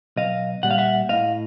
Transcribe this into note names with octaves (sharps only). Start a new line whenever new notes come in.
B1 D#5 F5
A#2 G3 F#5
F5
E5 F#5
A2 D#5 F5